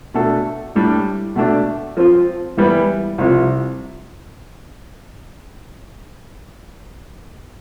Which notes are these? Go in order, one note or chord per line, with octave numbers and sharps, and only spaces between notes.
B2 A3 D4 A4
A2 G3 D4
B2 A3 D4
F3 C4 F4
E3 G3 B3 E4 B4
C2 C3 F3